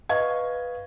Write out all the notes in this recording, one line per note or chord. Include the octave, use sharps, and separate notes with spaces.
B4 D#5 F5 C#6 G#6